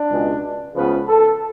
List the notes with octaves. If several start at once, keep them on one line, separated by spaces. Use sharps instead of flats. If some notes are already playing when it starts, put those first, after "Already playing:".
Already playing: D4
C#2 B2 G#3
C#2 C#3 F3 B3 B4
A4